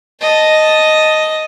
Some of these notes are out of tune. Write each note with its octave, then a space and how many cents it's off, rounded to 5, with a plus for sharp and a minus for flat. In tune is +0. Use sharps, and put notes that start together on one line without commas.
D#5 +0 A5 +0